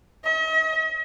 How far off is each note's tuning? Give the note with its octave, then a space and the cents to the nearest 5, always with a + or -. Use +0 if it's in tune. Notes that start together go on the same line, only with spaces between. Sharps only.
D#5 +45